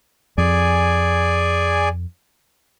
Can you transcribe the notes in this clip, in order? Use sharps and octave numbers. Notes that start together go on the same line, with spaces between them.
F2 G#4 D5 G#5